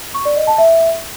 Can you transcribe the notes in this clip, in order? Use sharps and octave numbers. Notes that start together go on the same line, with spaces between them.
C#6
D5
D#5
A5
E5